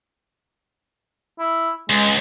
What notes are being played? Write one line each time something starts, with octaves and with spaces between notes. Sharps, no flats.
E4
C#2 G#3